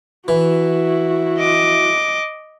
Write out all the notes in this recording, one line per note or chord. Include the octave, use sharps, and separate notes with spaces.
E3 E4 F#4
D#5 D6